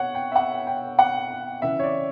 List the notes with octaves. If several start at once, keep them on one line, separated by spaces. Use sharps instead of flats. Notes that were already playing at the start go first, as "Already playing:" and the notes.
Already playing: B2 C#5 F#5
G5
E5
F#5
G5
F#5
C#3 E3 E5
C#5
D5